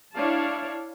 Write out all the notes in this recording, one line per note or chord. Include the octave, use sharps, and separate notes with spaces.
D4 E4 C#5 D5 F5 A5